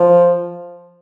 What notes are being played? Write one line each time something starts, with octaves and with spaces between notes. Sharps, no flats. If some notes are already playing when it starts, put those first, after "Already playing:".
Already playing: F3